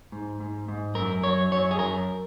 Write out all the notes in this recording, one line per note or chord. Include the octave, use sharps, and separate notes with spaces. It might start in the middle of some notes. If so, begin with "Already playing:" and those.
G#2
G#2
G#2
F#2 A#4
F#3 C#5
F#2 C#5
G#4
F#2 A#4